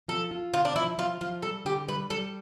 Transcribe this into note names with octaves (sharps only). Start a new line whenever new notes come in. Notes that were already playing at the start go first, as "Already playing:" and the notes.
F3 A4
F4
D3 F4
D4
F3 E4
F3 F4
F3 F4
G3 A4
D3 G4
G3 B4
G3 A4